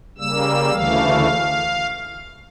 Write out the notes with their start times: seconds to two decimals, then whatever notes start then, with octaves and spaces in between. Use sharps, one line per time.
0.18 C#3 G3 A#3 E6
0.72 D2 C#3 E3 A3 F5